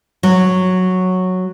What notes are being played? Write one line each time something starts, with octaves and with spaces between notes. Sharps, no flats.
F#3